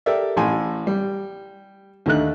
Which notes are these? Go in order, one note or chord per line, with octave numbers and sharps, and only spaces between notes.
G4 A4 A#4 D5 E5
A1 A2 G#5 C6
G3
D#2 D3 D#3 A3 D#4 F#6